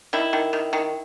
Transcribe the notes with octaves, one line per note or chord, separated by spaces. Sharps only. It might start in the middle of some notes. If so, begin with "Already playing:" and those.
D#3 E4
D#3
D#3
D#3